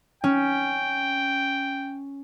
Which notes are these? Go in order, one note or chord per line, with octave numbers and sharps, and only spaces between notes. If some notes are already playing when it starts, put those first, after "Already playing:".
C#4 G5